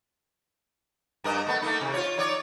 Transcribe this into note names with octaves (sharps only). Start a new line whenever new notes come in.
G2 A#4 D#5
A3 B3
A3 A#3 D#4
C3
F4 C#5
D#4 C#5 D5